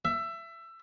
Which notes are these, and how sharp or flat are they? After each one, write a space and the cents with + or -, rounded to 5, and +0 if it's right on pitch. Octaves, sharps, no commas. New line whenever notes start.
E5 +20